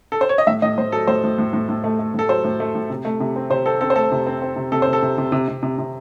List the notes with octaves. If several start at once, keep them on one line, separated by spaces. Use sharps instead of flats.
A4
C5
C#5
D#5
A2 E5
A2 D#5
A2 C5
F#3 A4
A2 C5
A2
A2
A2
A2
A3
A3
A2 A4
F#3 C5
A2
A3
A2
C3
A3
C3
C4
C3 C5
C4 A4
C4 A4
C5
A3 A4
C3
C4
C4
C3
C3 A4
C3 C5
A4
C3
C3
C3
C3
C3
C3